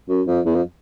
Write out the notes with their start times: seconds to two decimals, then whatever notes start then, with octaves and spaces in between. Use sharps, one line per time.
0.09 F#2
0.27 F2
0.46 E2
0.55 F2